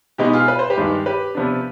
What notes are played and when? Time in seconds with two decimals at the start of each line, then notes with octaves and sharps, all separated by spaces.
0.18 B2 G#3 B3 D#4 G4
0.33 F4 G#4
0.48 B4
0.59 C5
0.70 G4 B4
0.77 G2 D#3 G#3
1.06 G4 B4
1.35 C3 F3 B3 D4